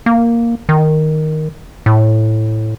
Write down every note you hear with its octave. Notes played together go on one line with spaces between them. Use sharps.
A#3
D#3
A2